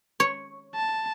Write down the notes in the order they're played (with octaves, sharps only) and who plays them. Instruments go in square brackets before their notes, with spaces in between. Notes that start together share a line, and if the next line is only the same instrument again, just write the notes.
[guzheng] C#5
[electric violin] A5